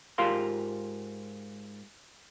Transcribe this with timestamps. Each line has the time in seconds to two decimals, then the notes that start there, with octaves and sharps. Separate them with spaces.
0.18 G#2 F4 G4 A#4 F5 C6